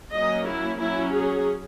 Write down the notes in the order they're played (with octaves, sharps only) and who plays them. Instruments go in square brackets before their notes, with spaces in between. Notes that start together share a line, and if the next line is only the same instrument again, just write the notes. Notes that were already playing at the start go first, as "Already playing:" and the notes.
[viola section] F#3 A#3 C#4 D#5
E4
F#3 C#4 E4
G#4